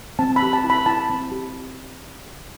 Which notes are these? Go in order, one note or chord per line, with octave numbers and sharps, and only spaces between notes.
C4 A5
B5
G4
A5
E4
B5
E4 A5
C4
G4